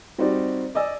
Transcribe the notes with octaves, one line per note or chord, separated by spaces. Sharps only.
G3 C4 D#4 F#4 D5
D5 D#5 G#5 E6